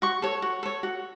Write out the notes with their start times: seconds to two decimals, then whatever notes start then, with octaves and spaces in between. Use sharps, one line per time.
0.02 F#4 C#6
0.22 A4 C#5
0.42 F#4
0.63 A4 C#5
0.83 F#4